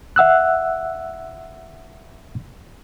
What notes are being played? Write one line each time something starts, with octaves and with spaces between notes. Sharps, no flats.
E5 F#5 E6 F#6